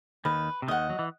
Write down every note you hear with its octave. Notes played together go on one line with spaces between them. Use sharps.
D#2 D#3 B4
C3
D#2 D#3 D#5 F#5
F#3
E3